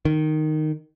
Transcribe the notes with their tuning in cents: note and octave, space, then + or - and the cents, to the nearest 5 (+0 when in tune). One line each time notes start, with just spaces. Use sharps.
D#3 -10